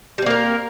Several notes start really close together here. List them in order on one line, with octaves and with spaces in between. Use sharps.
G3 C4 A#3 A#4